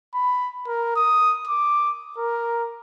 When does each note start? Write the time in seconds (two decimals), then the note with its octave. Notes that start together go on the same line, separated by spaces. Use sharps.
0.14 B5
0.67 A#4
0.96 D#6
1.47 D6
2.18 A#4